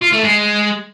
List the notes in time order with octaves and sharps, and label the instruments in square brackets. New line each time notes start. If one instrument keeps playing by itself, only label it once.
[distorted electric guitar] F4
A3
G#3